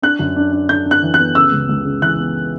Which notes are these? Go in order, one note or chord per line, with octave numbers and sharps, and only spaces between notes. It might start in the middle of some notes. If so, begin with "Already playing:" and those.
D4 F#6
F#2
D4
D4
D4 G6
D4
F#6
E3
F#6
B3
C#3 E6
C#2
C#2
C#3
E3 F#6
B3